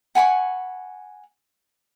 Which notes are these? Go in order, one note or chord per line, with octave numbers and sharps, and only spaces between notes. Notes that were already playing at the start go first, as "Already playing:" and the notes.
F#5 G#5 B5 C#6